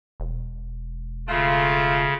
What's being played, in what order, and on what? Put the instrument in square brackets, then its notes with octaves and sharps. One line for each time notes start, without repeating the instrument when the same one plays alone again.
[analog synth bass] E1
[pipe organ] C#3 [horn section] A3 F4